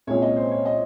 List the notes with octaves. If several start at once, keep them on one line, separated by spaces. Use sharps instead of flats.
C2 A#2 G#3 C#4 G#4 C#5
D#5
C5
C#5
D#5